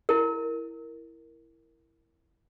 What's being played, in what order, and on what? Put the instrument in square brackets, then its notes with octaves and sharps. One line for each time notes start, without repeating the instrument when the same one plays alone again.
[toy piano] E4 A#4